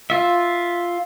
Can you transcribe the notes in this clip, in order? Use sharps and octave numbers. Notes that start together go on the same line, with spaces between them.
F4 E5